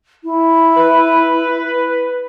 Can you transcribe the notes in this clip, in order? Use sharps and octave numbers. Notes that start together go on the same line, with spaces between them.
E4
B4